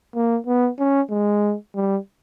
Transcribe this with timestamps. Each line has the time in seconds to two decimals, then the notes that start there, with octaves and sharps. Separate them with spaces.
0.15 A#3
0.47 B3
0.79 C#4
1.10 G#3
1.75 G3